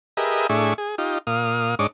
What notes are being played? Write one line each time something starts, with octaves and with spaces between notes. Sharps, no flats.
G4 G#4 A#4 B4 D#5 E5
A2 D4 G#4 E5 C#6
G#4
D#4 F4 G4
A#2 F5 D#6
G#2 D4 C#5 D#5 D6